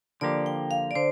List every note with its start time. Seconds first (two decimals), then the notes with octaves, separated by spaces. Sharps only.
0.21 D3 F3 A#3 G4 D5
0.46 G5
0.71 F5
0.91 D5
0.95 D3 C5